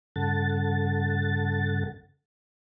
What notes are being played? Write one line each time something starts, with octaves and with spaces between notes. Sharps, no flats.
G2 C#3 A4 F#5 A6